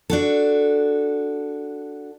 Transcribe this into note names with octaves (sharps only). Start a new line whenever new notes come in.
D4 F#4 A4